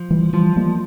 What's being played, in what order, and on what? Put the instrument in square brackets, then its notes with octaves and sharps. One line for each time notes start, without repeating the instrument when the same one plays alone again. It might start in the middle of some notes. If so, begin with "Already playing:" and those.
Already playing: [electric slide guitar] F3
[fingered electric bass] E3 G3
[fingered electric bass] E3 G3 [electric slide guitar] F3
[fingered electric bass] G3 A#3